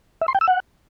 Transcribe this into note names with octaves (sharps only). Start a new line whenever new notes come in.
E5
C6
G5
E6
F#5